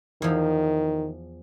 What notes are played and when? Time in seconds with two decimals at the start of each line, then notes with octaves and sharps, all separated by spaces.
0.22 E2 D#3 F3